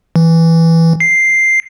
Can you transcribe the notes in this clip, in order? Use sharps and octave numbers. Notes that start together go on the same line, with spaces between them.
E3
C7